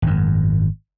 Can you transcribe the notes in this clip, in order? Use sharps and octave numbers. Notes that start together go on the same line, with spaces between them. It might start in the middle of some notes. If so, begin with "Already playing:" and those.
G#1 F#2